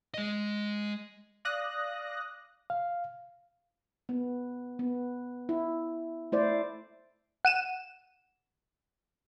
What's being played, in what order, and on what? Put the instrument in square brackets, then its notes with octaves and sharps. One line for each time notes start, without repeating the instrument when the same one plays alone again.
[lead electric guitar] G#3 D#5
[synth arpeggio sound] D5 F5 D#6 F#6 A#6
[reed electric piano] F5
[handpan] B3
B3
E4
A3 E4 C5 D5
[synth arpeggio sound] F#5 D#7 E7